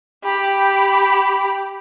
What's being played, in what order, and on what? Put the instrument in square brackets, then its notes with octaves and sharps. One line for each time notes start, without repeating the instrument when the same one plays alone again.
[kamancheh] G4 B5